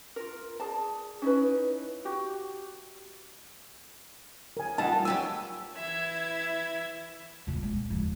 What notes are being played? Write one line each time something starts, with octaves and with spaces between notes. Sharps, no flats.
F4 A#4
G#4 D5 A5
C#4 D#4 E4 B4
F#4 G4
A#4 G#5
G3 D#4 F4 F#5 A5
F#3 G4 G#5 E6
E3 E4 E5 G#6
E2 A#2
G#3
D#1 F2